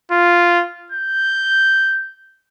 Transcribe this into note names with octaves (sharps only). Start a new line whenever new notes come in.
F4
G6